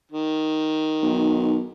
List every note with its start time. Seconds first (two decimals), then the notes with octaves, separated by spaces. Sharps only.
0.11 D#3
1.03 B1